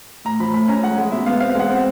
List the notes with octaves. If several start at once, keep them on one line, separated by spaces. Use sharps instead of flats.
A2 A#5
F3 B5
A3 B5
C#4 A#5
G#3 F#5
G#3
B2 E5
B3 F5
C4 F5
G#3 F#5
C4